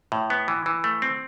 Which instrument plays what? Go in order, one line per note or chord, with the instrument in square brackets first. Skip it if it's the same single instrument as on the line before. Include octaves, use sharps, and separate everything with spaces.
[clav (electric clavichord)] A2
B3
E3
E3
A3
C4